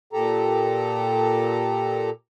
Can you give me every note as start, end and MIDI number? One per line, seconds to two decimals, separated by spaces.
0.13 2.10 46
0.13 2.10 67
0.13 2.10 69
0.13 2.10 82